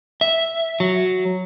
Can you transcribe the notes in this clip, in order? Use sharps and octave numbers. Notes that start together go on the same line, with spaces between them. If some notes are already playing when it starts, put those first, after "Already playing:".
E5
F#3